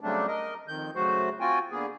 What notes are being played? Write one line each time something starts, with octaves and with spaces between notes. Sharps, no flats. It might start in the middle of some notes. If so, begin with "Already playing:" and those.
C#3 F#3 G3 A3 C4 D4
A#4 D#5
F2 D#3 G6
C#3 F#3 A3 F#4 C5
C4 F4 F#4 G5 G#5
D3 A#3 B3 G#4